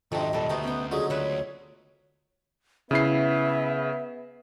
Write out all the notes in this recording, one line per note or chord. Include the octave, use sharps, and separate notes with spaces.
F2 G#2 C3 D#3 F#3 D4 D#5
D#2 A#2 G3 A4
D2 C3 B3 D#4 F#4
B3 C#4 G5
C#2 D3 F#3 G#4
D2 B4 C#5 E5 F#5
C#3 B3 E4 E5 C7